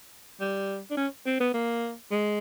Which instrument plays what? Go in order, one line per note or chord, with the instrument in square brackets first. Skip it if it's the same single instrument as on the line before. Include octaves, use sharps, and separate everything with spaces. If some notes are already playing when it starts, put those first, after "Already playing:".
[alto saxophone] G3
D4
C#4
C4
B3
A#3
G#3